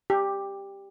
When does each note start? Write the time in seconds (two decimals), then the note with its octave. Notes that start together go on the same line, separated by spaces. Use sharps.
0.10 G4